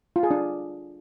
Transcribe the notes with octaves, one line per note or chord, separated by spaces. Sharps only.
F4
G#4
D4